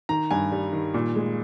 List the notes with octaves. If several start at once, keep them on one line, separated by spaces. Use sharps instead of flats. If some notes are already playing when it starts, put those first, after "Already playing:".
D#3 A#5
G2 G#5
G3
D#3
A#2
G#3